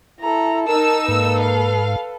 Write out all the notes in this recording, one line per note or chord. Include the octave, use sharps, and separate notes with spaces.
E4 A4 A#5
D#4 A#4 A5 E6
G#2 A#3 A4 B4
F5